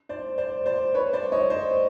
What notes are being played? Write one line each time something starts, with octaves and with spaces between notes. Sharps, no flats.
C5 D5
C5 D5
C5 D5
B4 C#5
C5 D5
C#5 D#5
C5 D5